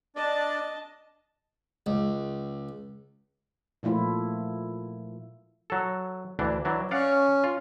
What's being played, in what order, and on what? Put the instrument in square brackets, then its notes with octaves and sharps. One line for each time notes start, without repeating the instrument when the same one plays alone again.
[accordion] D4 D5 [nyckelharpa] D#5 A5
[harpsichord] C#2
[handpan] A#2 F3 A3 E4 F4
[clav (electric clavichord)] F#3 A4
D2 E3 D4
E3 F#3 D4
[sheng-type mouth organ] C#4 [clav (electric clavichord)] D5 F5 F#5
[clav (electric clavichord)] F4